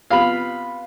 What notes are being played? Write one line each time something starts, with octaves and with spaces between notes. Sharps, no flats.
C3 B3 F4 F5 B5